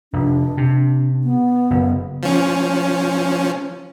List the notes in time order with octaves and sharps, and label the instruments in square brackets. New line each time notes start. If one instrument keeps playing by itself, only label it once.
[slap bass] F1 [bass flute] D4
[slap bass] C3
[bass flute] B3
[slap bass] F#1
[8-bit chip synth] F3 C#4